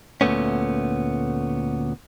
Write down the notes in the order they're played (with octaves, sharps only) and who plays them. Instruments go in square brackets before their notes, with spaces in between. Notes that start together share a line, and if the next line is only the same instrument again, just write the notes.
[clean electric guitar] D2 A#2 F3 A3 B3 C#4